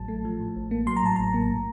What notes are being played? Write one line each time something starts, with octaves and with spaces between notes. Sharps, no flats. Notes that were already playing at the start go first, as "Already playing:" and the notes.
Already playing: A1 A2 F#3 A5
A3
F3
A2
A1
A#3
F#3 C6
A#5
A2 A5
A1 A#5
A#3
A2